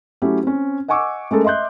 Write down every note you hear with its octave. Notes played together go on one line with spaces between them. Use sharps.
F#3 A3 C#4 E4 G4
C4 C#4
D#5 F#5 G#5 C#6 D6 E6
G#3 A3 C#4 A4 A#4
D#5 E5 C6 F#6 G6